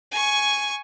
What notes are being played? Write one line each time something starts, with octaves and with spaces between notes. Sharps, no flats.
G#5 C#6